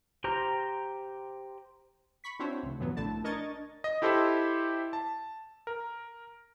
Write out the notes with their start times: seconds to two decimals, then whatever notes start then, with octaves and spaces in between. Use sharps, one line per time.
0.24 G4 C5 A#5 F6
2.24 B5 C#6 B6
2.39 C4 D4 E4 F#4 C5 C#5
2.63 D2 C#3
2.79 G2 A#2 E3 F#3 B3
2.97 A#1 D3 A3 E4 A5
3.24 D4 A#4 D#5 C#6 G#6 A6
3.84 D#5
4.02 E4 G4 A4 C5 D#5 E5
4.93 A5
5.67 A#4